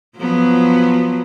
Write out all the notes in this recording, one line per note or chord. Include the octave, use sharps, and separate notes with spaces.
F3 F#3 B3